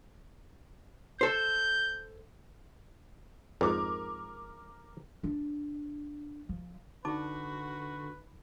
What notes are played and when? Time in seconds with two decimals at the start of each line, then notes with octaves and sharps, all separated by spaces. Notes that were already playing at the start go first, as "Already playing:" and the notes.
1.21 A4 C5 G6
3.61 F2 G#2 A#4 D6
5.23 D4
6.49 F3
7.05 D3 D#4 F#4 B4 A5 D6